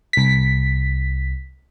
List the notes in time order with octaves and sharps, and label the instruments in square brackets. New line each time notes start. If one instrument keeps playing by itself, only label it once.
[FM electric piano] C2 B6